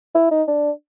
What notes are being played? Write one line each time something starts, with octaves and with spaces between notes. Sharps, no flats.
E4
D#4
D4